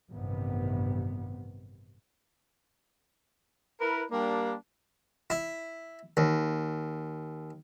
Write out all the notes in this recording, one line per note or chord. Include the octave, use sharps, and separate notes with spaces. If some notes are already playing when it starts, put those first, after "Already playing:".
A1 G2 C3 D#3 B3
E4 A#4 B4
G3 A#3 D4
E4
D#2